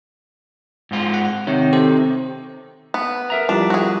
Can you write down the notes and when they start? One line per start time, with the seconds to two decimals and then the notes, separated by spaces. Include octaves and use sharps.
0.91 G#2 C4 F4
1.14 F#5
1.47 C3 D#3 C#5
1.73 G4 A4 C5
2.94 B3
3.30 A#4 E5 A#5
3.49 F3 G3 D4 E4
3.70 F#4 G#4